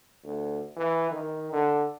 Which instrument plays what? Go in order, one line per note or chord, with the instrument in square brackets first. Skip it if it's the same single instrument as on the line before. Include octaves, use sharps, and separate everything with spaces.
[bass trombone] D2
E3
D#3
D3